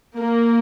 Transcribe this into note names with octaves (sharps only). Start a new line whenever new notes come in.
A#3